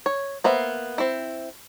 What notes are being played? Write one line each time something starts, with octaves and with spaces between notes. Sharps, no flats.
C#5
A#3 B3 C5 E5
C4 E4